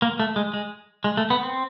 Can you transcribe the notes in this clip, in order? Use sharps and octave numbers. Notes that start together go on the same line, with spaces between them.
A#3
A3
G#3
G#3
G#3
A3
B3
C4